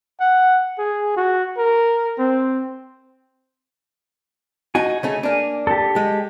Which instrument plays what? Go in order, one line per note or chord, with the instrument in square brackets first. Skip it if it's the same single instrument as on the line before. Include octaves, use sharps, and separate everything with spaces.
[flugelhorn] F#5
G#4
F#4
A#4
C4
[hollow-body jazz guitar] D#4 F#4 [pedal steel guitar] G#5
[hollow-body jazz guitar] C#3 A3 D#4
A#3 D4
[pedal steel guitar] G4 A4
[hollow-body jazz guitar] G#3